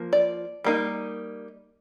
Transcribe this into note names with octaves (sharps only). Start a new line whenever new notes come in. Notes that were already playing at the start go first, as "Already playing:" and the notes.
Already playing: F3 A#3
D5
G3 A#3 D#4